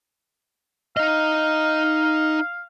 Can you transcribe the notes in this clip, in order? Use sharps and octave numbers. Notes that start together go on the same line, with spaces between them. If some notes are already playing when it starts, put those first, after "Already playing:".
D#4 D#5 F5